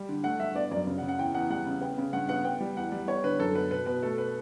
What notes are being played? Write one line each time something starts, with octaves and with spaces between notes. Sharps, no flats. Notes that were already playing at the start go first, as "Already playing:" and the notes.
Already playing: G3
D3
A3 F#5
G2 E5
B3 D5
F#2 D5
C#3
F#5
C#3
F#5
E2 G5
E2 F#5
G3 F#5
C#3
B3 G5
C#3
G2 F#5
B3 F#5
B3 G5
G3
E2 F#5
G3
B3 C#5
D3 B4
F#2 A4
B3 B4
B2 B4
B2 B4
A3 A4
B4